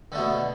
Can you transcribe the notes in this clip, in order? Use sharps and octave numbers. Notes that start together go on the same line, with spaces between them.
B2 D3 A3